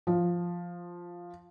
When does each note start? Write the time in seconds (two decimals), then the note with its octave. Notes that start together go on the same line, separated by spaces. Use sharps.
0.07 F3